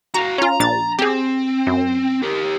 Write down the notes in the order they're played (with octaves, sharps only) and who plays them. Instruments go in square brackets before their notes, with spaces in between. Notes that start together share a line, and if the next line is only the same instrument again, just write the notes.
[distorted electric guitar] F#4 F5 [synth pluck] A#5
[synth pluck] C#4 F4 [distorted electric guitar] A#5
[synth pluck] A#1 D4 A6
[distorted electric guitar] C4 [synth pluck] G4 G#4
[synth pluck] F#2
[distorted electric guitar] G4 A#4